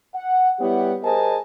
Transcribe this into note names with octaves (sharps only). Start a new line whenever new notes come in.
F#5
G3 B3 E4 G4 C#5 F#5
G#4 A#4 C5 D#5 G#5 A5